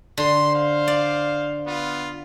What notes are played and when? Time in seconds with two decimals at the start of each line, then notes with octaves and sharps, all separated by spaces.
0.17 D3 C6
0.50 C5 F5
0.88 D5
1.65 B3 F4